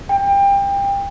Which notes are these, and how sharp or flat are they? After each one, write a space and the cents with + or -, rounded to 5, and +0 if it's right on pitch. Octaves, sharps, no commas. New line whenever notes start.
G5 +25